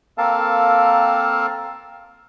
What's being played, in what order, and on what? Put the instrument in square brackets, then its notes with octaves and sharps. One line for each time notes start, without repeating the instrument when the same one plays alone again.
[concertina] A#3 C4 A4 A#4 F5 A5